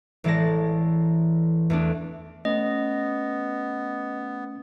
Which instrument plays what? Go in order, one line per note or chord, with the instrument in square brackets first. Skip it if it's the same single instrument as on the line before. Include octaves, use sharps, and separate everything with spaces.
[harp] A1 E3 G#3 D5 A5 A#6
E2 A3 D4
[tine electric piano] A3 C#4 [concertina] B3 [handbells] D#5